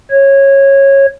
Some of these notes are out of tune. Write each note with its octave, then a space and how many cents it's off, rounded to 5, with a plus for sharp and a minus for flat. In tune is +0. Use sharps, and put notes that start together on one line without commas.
C#5 -15